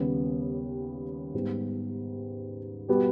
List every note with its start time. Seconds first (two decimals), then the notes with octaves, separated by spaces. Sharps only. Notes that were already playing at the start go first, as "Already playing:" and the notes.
Already playing: D#2 C#3 G3 B3
1.34 G#2 G3 B3
2.89 B2 G3 B3 G4